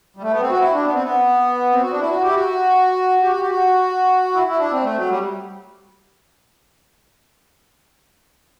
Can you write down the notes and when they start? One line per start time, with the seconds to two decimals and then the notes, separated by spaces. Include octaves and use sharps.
0.17 G3
0.22 A3
0.31 B3
0.41 C4
0.50 F#4
0.60 E4
0.72 D4
0.85 B3
0.94 C4
1.03 B3
1.72 C4
1.82 F#4
1.91 D4
2.00 E4
2.09 F#4
2.22 G4
2.29 E4
2.35 F#4
3.22 G4
3.31 F#4
3.41 G4
3.50 F#4
4.34 E4
4.47 E4
4.59 D4
4.72 C4
4.84 A3
4.97 F#3
5.09 G3